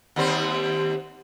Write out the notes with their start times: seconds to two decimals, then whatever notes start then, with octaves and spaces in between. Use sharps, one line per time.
0.16 D#2 G3 C4